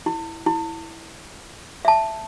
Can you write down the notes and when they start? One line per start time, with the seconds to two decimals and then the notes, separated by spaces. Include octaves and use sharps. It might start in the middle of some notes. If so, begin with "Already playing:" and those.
0.06 E4
0.46 E4
1.85 E5 A5